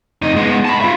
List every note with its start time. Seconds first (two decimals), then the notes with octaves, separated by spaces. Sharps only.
0.22 F2 D#4
0.36 G#3 B3
0.65 A5 B5
0.81 F4 E5